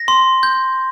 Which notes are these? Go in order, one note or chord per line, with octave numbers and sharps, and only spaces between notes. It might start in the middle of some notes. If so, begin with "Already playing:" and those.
Already playing: A#6
C6
G6